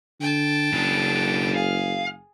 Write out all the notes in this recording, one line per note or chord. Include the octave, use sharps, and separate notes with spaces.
D3 G5 A5
F#1 C#3 D4
G#4 F5